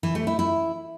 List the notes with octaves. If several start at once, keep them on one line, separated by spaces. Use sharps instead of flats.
E3
A3
E4
E4